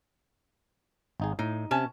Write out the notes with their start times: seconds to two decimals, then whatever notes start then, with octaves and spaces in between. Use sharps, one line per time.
1.20 G#1 D#4 G#4
1.39 A2 D#4
1.71 C3 C#4 A5